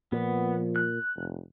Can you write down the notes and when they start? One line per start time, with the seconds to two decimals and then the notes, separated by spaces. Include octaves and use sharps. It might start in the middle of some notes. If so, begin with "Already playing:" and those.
0.12 A#2 F3 B3
0.76 F#6
1.16 F1